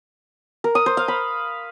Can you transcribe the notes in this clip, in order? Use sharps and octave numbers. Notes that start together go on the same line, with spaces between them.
A#4
D#6
C5
F5
B5